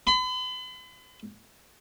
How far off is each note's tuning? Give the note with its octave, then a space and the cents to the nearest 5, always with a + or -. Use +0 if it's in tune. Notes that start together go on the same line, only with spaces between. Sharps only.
B5 +40